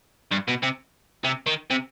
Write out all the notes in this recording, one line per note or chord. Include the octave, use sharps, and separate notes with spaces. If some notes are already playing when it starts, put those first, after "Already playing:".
G2
B2
C3
C3
D#3
C3